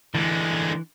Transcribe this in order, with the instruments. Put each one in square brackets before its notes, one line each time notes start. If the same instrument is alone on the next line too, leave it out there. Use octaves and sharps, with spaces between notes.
[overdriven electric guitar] D3 G#3 [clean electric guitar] E3